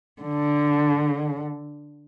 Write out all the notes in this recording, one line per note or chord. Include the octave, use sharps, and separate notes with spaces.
D3